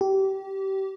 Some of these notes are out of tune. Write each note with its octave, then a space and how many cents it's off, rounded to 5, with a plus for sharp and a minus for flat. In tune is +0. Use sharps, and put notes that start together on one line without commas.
G4 -25